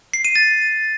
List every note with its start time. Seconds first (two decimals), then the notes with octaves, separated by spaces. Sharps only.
0.13 C7
0.25 D#7
0.36 A6